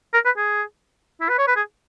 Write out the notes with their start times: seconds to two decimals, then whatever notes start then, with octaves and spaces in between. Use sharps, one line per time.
0.14 A#4
0.25 B4
0.37 G#4
1.20 E4
1.29 B4
1.38 C#5
1.47 B4
1.56 G#4